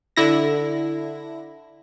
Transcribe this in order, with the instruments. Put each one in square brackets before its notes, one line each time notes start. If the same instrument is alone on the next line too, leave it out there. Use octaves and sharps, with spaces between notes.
[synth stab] D3 E4 A#6